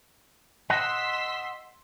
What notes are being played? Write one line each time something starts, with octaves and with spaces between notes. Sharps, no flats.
D#5 F#5 C6 E6 B6